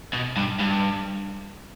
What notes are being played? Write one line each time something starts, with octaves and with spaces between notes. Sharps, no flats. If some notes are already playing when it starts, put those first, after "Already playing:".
B2
G2
G2